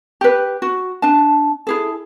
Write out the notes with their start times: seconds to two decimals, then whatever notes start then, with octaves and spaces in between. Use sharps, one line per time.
0.21 G4 B4
0.62 F#4
1.02 D4 A5
1.67 E4 G#4 A4